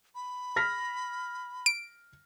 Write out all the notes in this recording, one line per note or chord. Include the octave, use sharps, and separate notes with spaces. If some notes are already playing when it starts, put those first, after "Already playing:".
B5
F6 A#6 B6
D7